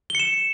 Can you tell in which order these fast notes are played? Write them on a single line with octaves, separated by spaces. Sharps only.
G7 C#7 E7